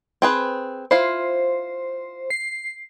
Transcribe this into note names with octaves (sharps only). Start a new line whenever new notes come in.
C4 G#4 B4
E4 F4 C5 F5
C7